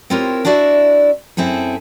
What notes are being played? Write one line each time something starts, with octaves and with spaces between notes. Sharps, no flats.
C4 E4 F4 G4 A#4 C#5
D4 E4 F#4 D5 E5
F#2 C4 E4 G#4 A4